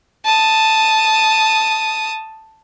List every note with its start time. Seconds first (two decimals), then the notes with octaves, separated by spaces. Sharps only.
0.25 A5 D#6